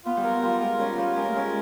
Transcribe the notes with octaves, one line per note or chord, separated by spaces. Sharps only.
B3 F4
G3
F#3 A#4
G3 F4
G#3 A#4
G3 C#4
F#3 G3 F4
G#3 A#4
A3
G#3 C#4